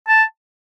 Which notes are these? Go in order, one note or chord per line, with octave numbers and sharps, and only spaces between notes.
A5